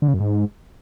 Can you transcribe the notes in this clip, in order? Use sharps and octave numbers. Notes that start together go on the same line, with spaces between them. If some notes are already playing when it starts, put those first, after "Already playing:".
D3
C#3
F#2
G#2